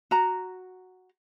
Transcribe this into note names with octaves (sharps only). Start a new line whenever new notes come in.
F#4 A#5